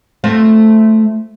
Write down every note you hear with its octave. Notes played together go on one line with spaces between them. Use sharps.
A3 C4 F4